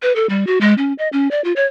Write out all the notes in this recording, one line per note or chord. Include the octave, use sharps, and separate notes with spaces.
B4
A4
G3
F#4
G#3
C#4
D#5
C#4
D5
F4
C#5